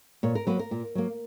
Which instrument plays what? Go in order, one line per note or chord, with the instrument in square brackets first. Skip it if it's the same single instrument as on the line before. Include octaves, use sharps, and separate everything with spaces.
[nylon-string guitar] A#2 C#5
A#4
F#3 A#3 B4
A#4
A#2
F#3 A#3